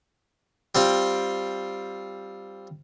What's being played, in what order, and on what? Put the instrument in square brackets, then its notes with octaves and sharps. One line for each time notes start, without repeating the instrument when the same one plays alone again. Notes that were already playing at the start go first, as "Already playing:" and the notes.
[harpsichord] G3 C4 F4